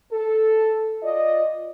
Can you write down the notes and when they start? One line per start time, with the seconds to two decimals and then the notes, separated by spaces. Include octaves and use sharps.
0.12 A4
1.03 F4 D5 D#5